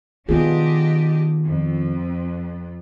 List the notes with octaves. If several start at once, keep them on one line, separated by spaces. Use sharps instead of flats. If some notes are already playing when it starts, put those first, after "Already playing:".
D#3 B3 D4 F4 G4 G#4 D#5
F2